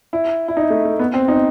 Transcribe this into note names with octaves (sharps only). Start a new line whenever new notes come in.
E4
E4
D#4
A3
A3
B3
C4
D#4